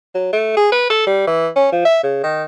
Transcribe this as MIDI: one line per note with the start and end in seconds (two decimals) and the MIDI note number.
0.15 0.29 54
0.33 0.56 57
0.57 0.70 68
0.72 0.88 71
0.90 1.05 69
1.07 1.23 55
1.27 1.48 52
1.56 1.71 61
1.72 1.83 53
1.85 2.01 76
2.03 2.19 49
2.23 2.43 51